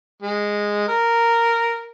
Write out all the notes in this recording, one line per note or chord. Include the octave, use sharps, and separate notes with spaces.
G#3
A#4